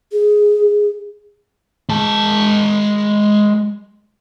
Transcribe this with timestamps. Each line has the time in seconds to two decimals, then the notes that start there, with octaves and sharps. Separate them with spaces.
0.12 G#4
1.89 G#3 A5